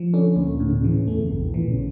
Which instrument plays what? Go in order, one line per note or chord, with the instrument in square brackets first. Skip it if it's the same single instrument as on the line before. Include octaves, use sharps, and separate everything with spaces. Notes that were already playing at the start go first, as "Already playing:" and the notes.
Already playing: [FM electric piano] F3
[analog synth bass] D3 [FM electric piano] C#4
[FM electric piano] D2 [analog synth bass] A#2
[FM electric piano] A2 [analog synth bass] D3
[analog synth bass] C#3
A#2
[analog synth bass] C#3 [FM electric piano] E3
[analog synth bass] E2 [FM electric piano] A3
[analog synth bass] F2
[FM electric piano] A#1 [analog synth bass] G2
[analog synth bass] E2
[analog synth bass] A#2 [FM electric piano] E3
[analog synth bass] C#3